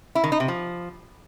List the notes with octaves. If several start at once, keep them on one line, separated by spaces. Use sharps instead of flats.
E4
D#3
D#4
C3
F3